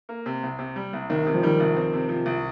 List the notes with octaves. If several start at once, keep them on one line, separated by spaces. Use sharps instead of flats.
A#3
C3
C2
C3
G3
C2
C2 D#3
C3
F3
D#3 G3
C2
C4
C3
F3
C2